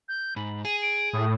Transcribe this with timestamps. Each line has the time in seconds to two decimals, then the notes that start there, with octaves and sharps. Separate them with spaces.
0.09 G6
0.36 G#2 B5
0.65 G#4 D#7
0.82 D7
1.13 A2 D#6